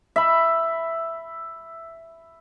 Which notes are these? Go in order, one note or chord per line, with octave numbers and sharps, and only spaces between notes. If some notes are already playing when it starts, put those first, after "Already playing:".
E5 B5